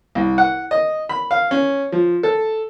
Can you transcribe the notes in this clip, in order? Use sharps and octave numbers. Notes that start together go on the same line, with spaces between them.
C2
F#5
D#5
B5
F5
C#4
F3
A4